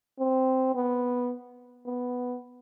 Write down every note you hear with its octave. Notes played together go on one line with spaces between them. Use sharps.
C4
B3
B3